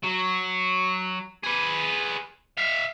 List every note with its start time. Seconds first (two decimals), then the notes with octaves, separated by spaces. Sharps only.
0.04 F#3
1.43 G#4 B4
2.58 E5 F5